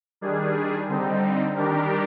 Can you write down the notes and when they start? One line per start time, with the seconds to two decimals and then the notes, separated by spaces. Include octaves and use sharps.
0.21 D#3 G3 D4 G#4
0.88 D3 G3 C4 D#4
1.55 D#3 G3 D4 G4 A#4